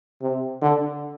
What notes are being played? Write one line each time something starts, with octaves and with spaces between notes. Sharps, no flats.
C3
D3